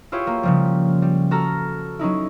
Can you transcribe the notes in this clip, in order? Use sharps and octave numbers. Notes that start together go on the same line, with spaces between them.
E4 F4 G4 G#4 C#5
A#3
C#3 F3 G3
G3
F#4 A4 A#5 F6
F#3 C#4 D#4 E4